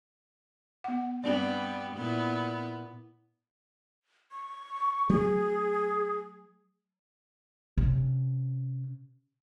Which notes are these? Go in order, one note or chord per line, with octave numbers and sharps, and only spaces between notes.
B3 F#5
G2 G3 B3 C4 D4 D5
A#2 B3 E4
C#6
F#3 A3 C4 G#4
C3 C#4